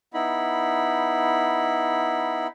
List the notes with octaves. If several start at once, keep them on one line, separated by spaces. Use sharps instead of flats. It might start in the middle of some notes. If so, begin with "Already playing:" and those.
B3 D#4 E4 B5